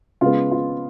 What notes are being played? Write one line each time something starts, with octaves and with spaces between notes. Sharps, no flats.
C#3 G#3 B3 F4
F4